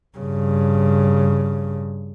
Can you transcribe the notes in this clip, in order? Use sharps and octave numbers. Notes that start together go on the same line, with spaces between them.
G2 C#3